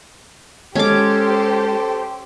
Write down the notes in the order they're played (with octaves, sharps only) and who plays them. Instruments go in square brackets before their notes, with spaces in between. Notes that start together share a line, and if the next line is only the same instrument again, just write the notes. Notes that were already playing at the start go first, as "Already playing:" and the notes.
[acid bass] G#3 [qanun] C#4 D6 [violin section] G4 C5 [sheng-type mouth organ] A4